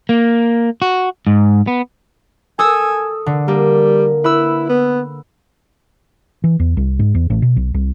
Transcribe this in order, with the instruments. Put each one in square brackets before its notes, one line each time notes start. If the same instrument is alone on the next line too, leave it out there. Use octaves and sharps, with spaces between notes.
[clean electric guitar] A#3
F#4
G#2
B3
[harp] A4 D#6 E6 [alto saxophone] G#5
[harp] D3
[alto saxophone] G3 [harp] A#3
[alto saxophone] E4 [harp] B4 B5 E6
[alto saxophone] B3
[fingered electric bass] E3
E2
C2
G#2
E2
A1
B2
B1
C2